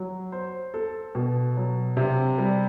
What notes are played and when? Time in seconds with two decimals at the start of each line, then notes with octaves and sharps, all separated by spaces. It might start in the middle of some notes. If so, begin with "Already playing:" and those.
Already playing: F#3
0.32 C5
0.74 A4
1.15 B2
1.57 F#3
1.97 C3
2.38 G3